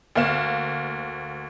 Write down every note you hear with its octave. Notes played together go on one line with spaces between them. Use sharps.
D2 A#3 F5 E7